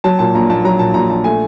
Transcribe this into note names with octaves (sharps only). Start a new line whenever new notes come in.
F#3 A5
A#2 A5
A#1 A#5
A#1 A5
F#3 A#5
A#2 A5
A#1 A#5
A#1 A5
A3 G#5